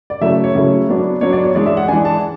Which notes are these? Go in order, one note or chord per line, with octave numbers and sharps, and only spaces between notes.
D5
C#3 F#3 A3 E4 E5
C#5
C#3 F#3 A3 E4
F#3 B3 D4
F#3 B3 D4 C#5
D5
C#5
E3 G#3 D4 D5
E5
F#5
E3 G#3 D4 G#5
A5